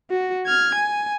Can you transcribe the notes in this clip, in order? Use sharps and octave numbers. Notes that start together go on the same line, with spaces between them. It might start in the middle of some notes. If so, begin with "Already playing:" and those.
F#4
F6 G#6
G#5